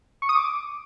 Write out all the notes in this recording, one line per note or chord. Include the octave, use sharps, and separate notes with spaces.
C#6
D#6
D6